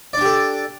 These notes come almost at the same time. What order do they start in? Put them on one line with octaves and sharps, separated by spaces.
D5 D4 G4 A4